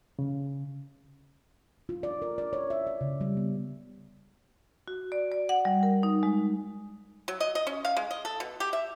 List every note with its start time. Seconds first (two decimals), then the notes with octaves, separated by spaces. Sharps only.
0.19 C#3
1.89 F4
2.03 D5
2.22 A#4
2.38 D5
2.53 C#5
2.70 E5
2.87 D5
3.01 C#3
3.21 G3
3.37 B3
4.88 F#4
5.12 D5
5.32 D5
5.49 F#5
5.65 G3
5.83 A#4
6.03 D#4
6.23 G#3
7.28 F#3
7.40 D#5
7.55 D#5
7.67 C#4
7.85 F5
7.97 G#3
8.11 D#5
8.25 A4
8.40 B2
8.60 G4
8.73 E5